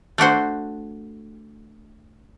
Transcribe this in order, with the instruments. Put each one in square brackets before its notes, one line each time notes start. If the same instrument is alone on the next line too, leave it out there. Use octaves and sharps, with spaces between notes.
[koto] A3 D4 F#4 C5